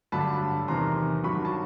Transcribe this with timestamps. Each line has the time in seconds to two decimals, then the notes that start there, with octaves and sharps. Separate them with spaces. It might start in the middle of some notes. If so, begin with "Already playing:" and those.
0.12 G2 D3 F#3 A3 A5 B5
0.68 E2 C3 D#3 A#5 C6
1.24 G2 D#3 F#3 B5 C#6
1.45 A5